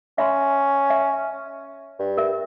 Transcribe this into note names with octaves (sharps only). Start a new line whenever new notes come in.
C#4 E5 B5 C6
E5
G2
A#4 E5